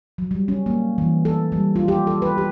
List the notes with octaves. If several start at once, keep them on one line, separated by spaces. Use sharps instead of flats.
F#3
G3
C#4
A#3
E3
A4
G3
F4
G4
A4
B4
G4